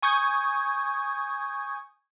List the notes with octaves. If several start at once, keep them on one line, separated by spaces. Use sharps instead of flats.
G#5 C#6 D#6 G6 G#6